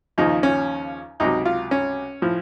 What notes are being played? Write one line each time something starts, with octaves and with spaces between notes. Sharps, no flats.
D#2 C#3 F3 D#4
C#4
C#2 C3 F#3 D#4
F4
C#4
A2 F3